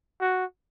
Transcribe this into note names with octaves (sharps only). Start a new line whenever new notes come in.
F#4